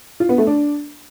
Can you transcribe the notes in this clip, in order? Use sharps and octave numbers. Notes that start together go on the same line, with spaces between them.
F4
B3
A3
D4